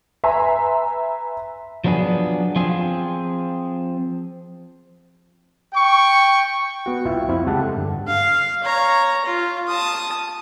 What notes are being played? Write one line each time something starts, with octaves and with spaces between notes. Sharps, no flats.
B4 E5 G#5 A#5 C6
F3 F#3 B3 D4 G#4
F3 C4 F4 G#4
G5 C#6
B3 F#4
C2 E4 F4 E5 G5
F2 C4 E4
C#3 G#3 G4 F#5 A5
A4
G2 D3
F5
C#5 A#5
F4
A5 D#6